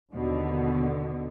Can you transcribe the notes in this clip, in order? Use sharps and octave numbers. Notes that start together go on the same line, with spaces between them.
D#2 B2 D3